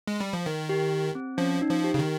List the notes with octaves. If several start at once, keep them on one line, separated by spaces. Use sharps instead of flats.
G#3
G3
F3
D#3
G4
C4
F3 C#4
D#4
F3
G4
C#3
D#3